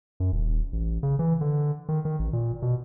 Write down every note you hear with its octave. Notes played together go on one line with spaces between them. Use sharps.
F#2
D#1
A1
C#3
E3
D3
D#3
D#3
A1
A#2
B2